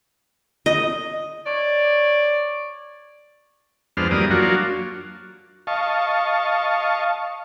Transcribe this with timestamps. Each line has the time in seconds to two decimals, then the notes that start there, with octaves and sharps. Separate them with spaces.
0.66 D#5
1.46 C#5 D5
3.97 F2 G#3 B3 D4 C5 F6
4.11 F#2 E3 G3 A#3 D5 D#6
4.31 F#3 A#3 D4 F4 F#4
5.67 D#5 F5 A5 C#6